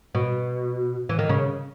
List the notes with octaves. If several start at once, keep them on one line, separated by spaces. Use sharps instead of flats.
B2
E3
D#3
C#3